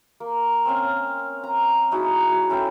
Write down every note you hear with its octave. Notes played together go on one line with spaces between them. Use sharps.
A#3
C4 C#4 F5
A#5
D#4 E4 F#4 G#4
F#4
C#4 E4 A4 G5